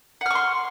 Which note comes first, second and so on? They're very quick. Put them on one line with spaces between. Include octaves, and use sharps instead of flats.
F#5 F6 C#6 C6